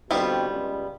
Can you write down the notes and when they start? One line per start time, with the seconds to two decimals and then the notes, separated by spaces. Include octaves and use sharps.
0.11 B2 D3 G3 B3 C4 F4
0.50 C#2